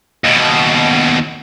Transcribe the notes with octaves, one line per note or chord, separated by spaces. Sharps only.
D#2 B2